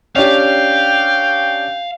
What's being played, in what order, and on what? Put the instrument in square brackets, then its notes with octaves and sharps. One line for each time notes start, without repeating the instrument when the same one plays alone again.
[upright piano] C#4 D4 G4 [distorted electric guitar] F5 [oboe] G5